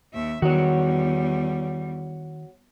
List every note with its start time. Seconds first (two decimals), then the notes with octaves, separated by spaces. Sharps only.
0.13 D#2 E5
0.42 E2 D#3 G3 F#4 C#5